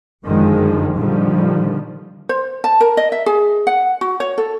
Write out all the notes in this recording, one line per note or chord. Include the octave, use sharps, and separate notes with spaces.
G1 F#2 D3 D#3 F3 G#3
A#2 D3 D#3 F3 G3
C5
A5
A#4
D#5
E5
G#4
F#5
F#4
C#5
A4